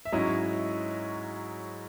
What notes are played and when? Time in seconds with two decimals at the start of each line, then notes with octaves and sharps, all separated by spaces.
0.05 E5
0.12 G#2 F#3 C#4 E4 D#5